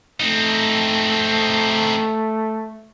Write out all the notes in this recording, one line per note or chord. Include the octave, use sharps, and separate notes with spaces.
A3 C4 D#4